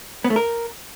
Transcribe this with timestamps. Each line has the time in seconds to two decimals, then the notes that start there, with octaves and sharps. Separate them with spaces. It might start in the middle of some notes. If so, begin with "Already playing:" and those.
0.24 B3
0.30 A3
0.36 A#4